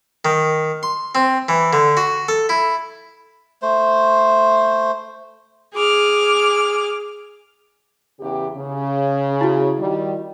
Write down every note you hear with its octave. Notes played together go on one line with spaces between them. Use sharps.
D#3
C6
C4
E3
D3
F#4
A4
E4
A3 C5
G#4 D6 F6
E2 C#3 G4
C#3
E4 F#4
D#3 G3